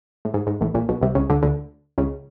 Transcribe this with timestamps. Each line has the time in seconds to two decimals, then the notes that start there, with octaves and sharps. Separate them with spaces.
0.25 A2
0.34 G#2
0.47 G#2
0.61 A1 A2
0.74 A#1 A#2
0.89 B1 B2
1.02 C2 C3
1.15 C#2 C#3
1.30 D2 D3
1.43 D2 D3
1.98 C#2 C#3